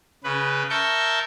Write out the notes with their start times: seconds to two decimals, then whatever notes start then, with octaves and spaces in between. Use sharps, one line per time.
0.24 C#3 B4
0.70 A#4 E5 A5 C#6 G6